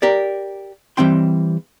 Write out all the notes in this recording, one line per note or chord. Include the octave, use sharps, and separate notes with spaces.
G4 A#4 D5
E3 G3 C4 G5 C6